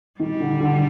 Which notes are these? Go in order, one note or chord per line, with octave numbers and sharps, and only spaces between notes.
D#3 G3
D3
D3